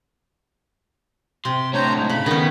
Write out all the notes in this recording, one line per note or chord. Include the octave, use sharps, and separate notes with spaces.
C3 C6
A2 D4 C5 C#5 A#5
G#2
C#3 B5
D#3 B3 C#4